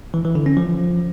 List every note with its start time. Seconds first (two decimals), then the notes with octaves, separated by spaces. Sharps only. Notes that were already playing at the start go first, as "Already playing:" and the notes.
0.14 E3
0.25 E3
0.35 D3
0.46 C#4
0.57 F3